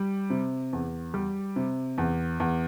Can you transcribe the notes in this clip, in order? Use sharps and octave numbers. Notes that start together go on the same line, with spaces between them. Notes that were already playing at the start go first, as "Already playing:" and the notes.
Already playing: G3
C3
E2
G3
C3
E2
E2